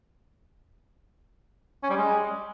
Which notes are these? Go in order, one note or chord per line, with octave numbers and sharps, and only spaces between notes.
C#4
G3
G#3